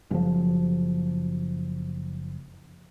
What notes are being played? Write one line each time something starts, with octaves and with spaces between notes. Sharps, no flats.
F#1 F3